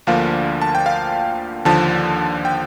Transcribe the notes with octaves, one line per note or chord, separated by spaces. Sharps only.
D2 D3 F3 A#3 D4 F5
A5
G5
F5
D#2 D3 F3 A5
G5